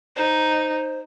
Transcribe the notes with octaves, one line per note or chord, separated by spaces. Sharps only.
D#4 C5